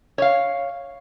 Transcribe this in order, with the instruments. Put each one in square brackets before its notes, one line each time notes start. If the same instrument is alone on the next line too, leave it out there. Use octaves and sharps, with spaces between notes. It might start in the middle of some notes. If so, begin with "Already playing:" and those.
[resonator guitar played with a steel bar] C#5 F5